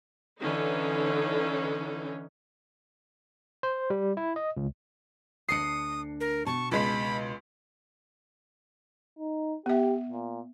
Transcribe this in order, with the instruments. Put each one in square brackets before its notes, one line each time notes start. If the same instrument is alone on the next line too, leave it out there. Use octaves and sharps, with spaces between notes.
[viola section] D3 E3 C#4 D#4
[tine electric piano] C5
G3
E4
D#5
C#2
[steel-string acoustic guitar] D2 D4 [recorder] D#6 [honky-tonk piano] C7 C#7
[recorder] A#4
[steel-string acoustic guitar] B2 A5 [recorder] C#6
[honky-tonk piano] C#2 G#3 B6 [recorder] B5
[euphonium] D#4
[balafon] B3 E5 [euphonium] G4
[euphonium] A#2